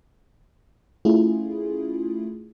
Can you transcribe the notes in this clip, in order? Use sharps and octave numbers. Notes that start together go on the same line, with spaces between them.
A3 C#4 E4 F4 G#4